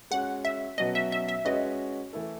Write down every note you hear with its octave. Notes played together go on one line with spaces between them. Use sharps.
G#3 C#4 F#4 F#5
E5
B2 F#3 C#4 F#4 B4 D#5
E5
E5
E5
G#3 C#4 F#4 B4 D#5
E3 A3 E4 A4